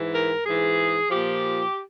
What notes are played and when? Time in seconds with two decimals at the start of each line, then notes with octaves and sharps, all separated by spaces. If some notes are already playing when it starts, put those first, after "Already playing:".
Already playing: G#2 E3
0.12 A#4
0.45 G#2 E3 G#4
1.09 A#2 F3 G4